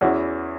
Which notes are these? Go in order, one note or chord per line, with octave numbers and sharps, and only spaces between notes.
E2 E3 C#4 F#4